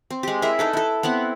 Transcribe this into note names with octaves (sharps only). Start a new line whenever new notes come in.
C4
G#3 G4
E4 G#4 A#4 E5
D#4 A4 B4
E4 A4
B3 C4 E4 F#5